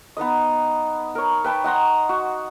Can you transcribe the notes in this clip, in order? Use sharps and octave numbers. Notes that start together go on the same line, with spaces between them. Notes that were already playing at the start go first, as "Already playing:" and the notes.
B3 D#4 B4 D#5
A#4 C#5
B4 G5 A5 B5
D#5 F#5 A#5 C6
F#4